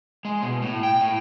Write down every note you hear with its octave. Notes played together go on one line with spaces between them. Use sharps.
G#3
B2
A2
G5
A2